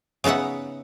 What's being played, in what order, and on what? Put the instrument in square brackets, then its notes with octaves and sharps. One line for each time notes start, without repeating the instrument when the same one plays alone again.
[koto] C#3 B3 D#4 E5 F#5